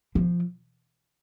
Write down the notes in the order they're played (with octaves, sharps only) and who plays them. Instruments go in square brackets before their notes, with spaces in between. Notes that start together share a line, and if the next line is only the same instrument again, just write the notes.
[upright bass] F3